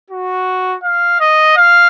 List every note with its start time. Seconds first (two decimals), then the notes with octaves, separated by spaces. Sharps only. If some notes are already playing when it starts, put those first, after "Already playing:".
0.10 F#4
0.84 F5
1.20 D#5
1.57 F5